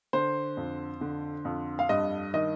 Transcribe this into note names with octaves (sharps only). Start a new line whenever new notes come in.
D3 C5
F2
D3
F2
F5
G2 D#5
D#3 D#5